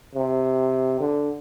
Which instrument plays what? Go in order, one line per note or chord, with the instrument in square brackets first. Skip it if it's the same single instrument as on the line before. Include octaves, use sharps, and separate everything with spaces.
[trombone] C3
D3